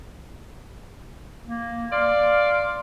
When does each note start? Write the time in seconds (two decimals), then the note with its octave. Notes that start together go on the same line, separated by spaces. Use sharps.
1.45 A#3
1.92 D5 F5 C6